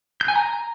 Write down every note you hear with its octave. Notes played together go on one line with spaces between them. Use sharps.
G6
G#5
A#5